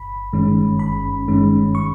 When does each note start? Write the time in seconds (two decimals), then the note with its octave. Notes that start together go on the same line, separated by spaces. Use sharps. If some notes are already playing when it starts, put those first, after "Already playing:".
Already playing: G1 B5
0.33 G2 D#3 G#3 C#4
0.79 G1 B5
1.27 G2 D#3 G#3 C#4
1.75 C#6